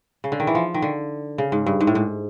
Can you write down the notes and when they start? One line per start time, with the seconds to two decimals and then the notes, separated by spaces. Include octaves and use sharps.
0.24 C#3
0.32 D3
0.40 D#3
0.47 E3
0.55 F3
0.74 D#3
0.82 D3
1.38 C#3
1.52 G#2
1.66 G2
1.81 G#2
1.87 A2
1.95 G#2